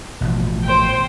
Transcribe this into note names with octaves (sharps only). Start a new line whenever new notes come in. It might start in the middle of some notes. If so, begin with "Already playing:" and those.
A1 B2 F3
C5 G5